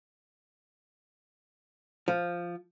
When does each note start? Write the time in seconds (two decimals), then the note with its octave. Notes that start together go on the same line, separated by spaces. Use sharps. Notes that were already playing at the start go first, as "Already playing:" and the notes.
2.08 F3